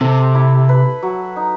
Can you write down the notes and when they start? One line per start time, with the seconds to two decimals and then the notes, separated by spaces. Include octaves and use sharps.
0.01 C3 A4
0.35 E4
0.69 B4
1.03 F#3
1.36 D#4